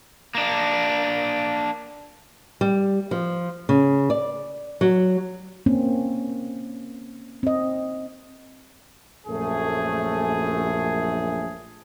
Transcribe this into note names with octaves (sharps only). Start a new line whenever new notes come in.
A#3 D4
G3
F3
C#3
D5
F#3
A#3 C4 C#4
C4 D#5
A#1 F#2 A3 G#4